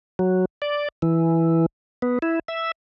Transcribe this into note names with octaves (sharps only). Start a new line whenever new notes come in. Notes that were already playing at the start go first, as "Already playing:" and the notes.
F#3
D5
E3
B3
E4
E5